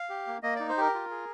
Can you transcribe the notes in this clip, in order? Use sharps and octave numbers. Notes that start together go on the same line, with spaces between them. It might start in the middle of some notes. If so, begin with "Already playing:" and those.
Already playing: F5
G4
A#3
A#3 D#5
D#4 D5
C5
G4 A#4
F4
G#4